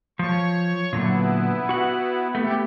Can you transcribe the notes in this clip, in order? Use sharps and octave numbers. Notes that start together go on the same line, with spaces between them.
F3 C#5 C#6
A#2 D3 F#3 B3 E4
F#4 F#5
A3 B3 E4 G4